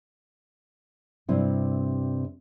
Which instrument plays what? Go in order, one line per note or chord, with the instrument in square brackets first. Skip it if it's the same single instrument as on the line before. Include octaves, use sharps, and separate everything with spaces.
[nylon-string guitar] G2 C3 C4 E4